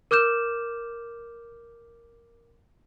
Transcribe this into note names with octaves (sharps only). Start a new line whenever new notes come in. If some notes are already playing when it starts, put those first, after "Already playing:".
A#4 D6 F6 G6 E7